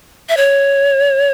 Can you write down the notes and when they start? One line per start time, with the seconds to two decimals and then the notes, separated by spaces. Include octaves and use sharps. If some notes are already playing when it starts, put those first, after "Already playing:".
0.29 E5
0.37 C#5